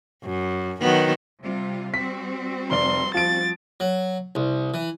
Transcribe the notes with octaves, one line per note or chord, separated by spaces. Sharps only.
F#2
D#3 F#3 B3
C3 G3 F4
G3 C4 F#4 B6
F1 D5 C6 G7
F3 A6 D7
F#3
C2
E3